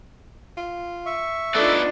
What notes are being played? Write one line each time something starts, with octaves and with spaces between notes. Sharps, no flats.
F4
E5 C#6
A3 B3 D4 D#4 F4 D5